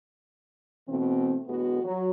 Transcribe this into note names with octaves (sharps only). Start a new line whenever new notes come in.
B2 E3 A3 C4
D2 A2 G#3 B3 F#4
F#3